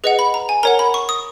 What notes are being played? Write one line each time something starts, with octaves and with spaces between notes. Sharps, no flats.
G#4 B4 D#5 F#5
B5
A#5
G#5
A#4 C#5 F#5 A#5
B5
C#6
D#6